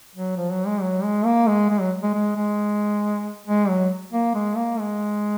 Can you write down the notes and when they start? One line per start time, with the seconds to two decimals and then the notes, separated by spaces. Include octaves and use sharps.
0.16 F#3
0.37 F3
0.52 F#3
0.67 G#3
0.82 F#3
1.03 G#3
1.25 A#3
1.47 G#3
1.70 G#3
1.80 F#3
2.03 G#3
2.14 G#3
2.36 G#3
3.47 G#3
3.69 F#3
4.13 A#3
4.35 G#3
4.57 A#3
4.79 G#3